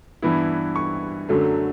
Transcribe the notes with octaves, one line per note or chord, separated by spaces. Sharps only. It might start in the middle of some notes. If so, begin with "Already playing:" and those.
G2 E3 B3 E4
C#6
F#2 D3 F#3 A3